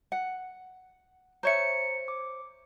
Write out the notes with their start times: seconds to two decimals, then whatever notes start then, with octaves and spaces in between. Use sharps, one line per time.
0.12 F#5
1.43 C5 C#5 E5 A#5 C#7
2.08 D6